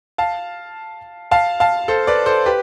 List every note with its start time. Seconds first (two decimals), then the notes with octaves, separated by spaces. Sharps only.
0.18 F5 A5
1.31 F5 A5
1.60 F5 A5
1.88 A4 C5
2.07 B4 D5
2.26 A4 C5
2.46 G4 B4